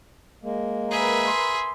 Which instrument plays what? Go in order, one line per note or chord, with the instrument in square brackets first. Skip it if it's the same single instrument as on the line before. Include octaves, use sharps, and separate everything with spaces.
[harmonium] G#3 A#3
[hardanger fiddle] G#4 E5 [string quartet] A#4 B4
[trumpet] C6